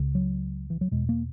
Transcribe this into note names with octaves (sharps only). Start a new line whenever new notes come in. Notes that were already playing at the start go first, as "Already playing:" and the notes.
Already playing: C#2 C#3
F#3
E3
F#3
E2 B2 G#3
A#3